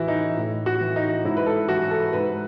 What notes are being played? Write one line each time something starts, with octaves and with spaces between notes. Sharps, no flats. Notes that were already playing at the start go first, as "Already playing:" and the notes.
Already playing: A2 E3 E4 F#4
D#4
A2
F#4
E3
D#4
G#2 E4
B4
A4
E3 F#4
A4
G#2 B4